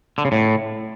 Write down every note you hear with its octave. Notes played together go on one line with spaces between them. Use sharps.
D3
C#3
A2